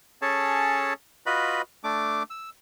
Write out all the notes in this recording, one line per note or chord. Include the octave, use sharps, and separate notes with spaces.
C#4 G#4 A4 C#5 A5
F4 F#4 B4 D#5 B5
A3 D4 D6
E6